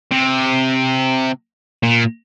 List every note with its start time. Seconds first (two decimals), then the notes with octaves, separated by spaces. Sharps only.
0.12 C3
1.83 A#2